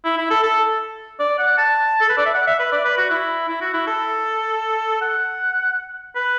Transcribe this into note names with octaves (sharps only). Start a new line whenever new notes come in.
E4
E4
A4
A4
D5
F#5
A5
A4
B4
D5
E5
F#5
E5
B4
D5
B4
F#4
E4
E4
F#4
E4
A4
F#5
B4